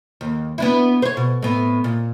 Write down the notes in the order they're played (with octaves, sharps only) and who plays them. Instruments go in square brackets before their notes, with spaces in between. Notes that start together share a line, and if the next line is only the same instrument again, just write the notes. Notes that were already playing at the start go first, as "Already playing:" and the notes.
[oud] D#2
B3 D4 E4
C5 C#5
B2
A2 B3
A#2